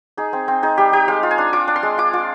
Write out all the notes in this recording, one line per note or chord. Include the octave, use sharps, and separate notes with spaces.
D#4 G#4
C4
C4
D#4 G#4
G3 G4
D#4 G4
G#3 F5
F4
G#5
D4
F4 D6
D4
C6
G#3
F4 D6
F4